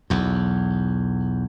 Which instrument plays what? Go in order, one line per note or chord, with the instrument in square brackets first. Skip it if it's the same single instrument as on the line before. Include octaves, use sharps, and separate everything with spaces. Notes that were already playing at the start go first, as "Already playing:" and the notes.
[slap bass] B1 E2